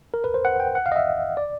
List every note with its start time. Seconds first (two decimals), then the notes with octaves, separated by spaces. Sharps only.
0.14 A#4
0.24 B4
0.34 C5
0.45 F#5
0.60 G5
0.75 F#5
0.86 F5
0.92 D#5
0.96 E5
1.37 D5